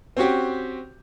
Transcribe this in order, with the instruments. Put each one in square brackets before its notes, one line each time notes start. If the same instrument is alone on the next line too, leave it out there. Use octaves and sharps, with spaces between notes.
[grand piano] C4 C#4 F#4 G4